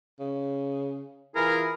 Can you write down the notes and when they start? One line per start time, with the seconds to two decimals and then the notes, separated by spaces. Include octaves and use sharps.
0.20 C#3
1.36 E3 E4 F4 G#4 A#4